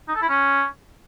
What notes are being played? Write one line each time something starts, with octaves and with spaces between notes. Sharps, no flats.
D#4
A4
E4
C#4